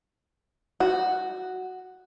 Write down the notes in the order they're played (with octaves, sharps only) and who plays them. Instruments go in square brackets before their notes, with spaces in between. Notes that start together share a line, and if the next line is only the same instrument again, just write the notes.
[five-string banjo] F#4